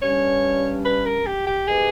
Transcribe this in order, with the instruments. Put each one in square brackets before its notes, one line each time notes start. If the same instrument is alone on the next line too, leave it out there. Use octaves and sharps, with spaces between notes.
[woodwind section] G2 G3 C#4 [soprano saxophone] C#5
[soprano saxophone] B4
A#4
G4
G4
[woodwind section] A#3 D#4 G4 B4 [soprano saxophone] G#4